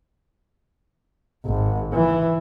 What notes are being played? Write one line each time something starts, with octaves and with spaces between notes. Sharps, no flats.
G#1
E3